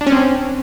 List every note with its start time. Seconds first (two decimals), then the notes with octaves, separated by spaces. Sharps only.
0.01 D4
0.07 C#4
0.12 C4